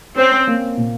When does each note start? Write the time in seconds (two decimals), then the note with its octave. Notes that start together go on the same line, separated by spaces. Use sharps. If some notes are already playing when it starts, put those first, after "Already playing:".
0.16 C4 C#4
0.47 A#3
0.77 A#2